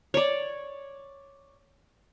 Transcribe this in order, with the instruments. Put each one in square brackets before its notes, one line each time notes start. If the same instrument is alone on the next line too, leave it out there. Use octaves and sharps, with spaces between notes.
[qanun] C#5 D5